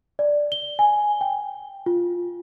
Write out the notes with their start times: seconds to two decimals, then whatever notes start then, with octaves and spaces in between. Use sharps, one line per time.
0.19 D5
0.52 G7
0.79 G#5
1.21 G5
1.86 F4